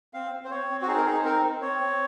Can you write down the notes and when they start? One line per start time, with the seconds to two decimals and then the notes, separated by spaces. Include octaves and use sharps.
0.14 C4 F5
0.31 C4
0.45 C5
0.51 C4 C#5
0.69 C4
0.82 F#4
0.87 D#4 G#4
0.97 A#4
1.05 D#4 G#4
1.18 C5
1.25 C4 A#4
1.43 C4
1.61 C4 C#5
1.80 C4